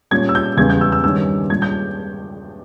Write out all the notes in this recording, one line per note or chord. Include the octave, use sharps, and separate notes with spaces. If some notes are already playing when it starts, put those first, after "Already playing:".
A#2 G3 C#4 G#6
E6
G6
E2 C#3 G3 B3 G#6
G6
E6
E6
G2 D#3 G3 C#4 E6
A#2 G3 C#4 G#6
G6